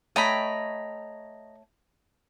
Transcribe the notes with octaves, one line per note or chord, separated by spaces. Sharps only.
A3 C#5 D#5 G5 A#5 B5